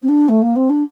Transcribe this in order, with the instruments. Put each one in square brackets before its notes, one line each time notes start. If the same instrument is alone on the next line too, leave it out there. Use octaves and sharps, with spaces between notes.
[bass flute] C4
D4
A3
A#3
C4
D4